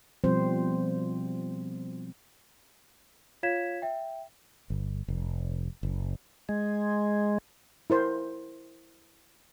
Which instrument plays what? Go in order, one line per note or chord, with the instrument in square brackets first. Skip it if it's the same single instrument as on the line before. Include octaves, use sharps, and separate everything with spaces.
[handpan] B2 F3 G3 C4 C5
[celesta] F4 C#5 F5 G#6 B6 E7
E5 G5
[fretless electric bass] G1
F1
F#1
[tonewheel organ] G#3
[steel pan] E4 A#4 C5